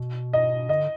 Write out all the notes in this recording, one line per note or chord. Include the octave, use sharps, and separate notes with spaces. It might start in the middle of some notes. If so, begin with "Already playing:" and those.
Already playing: B2
D#5
D3 D#5